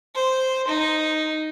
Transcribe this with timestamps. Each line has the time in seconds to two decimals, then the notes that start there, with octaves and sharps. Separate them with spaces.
0.15 C5
0.68 D#4